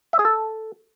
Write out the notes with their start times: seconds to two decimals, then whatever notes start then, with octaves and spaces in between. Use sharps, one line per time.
0.13 E5
0.19 G#4
0.25 A4